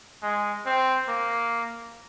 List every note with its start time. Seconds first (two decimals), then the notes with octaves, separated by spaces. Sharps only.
0.23 G#3
0.66 C4
1.08 A#3